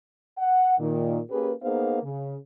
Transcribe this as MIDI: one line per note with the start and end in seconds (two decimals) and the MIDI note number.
0.38 0.78 78
0.79 1.19 46
0.79 1.19 51
1.30 1.51 58
1.30 1.51 61
1.30 1.51 67
1.30 1.51 68
1.30 1.51 71
1.62 1.99 58
1.62 1.99 59
1.62 1.99 63
1.62 1.99 68
1.62 1.99 72
1.62 1.99 77
2.03 2.35 49